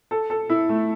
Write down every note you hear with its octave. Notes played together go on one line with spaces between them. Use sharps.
A4
A4
E4
A3